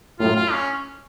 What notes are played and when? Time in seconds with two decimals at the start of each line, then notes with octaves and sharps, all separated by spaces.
0.20 F#2 A2 F4
0.36 F4
0.52 C#4